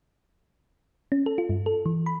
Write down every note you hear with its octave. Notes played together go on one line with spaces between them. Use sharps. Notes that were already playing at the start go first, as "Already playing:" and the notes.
C#4
A4
F4
G2
A4
E3
B5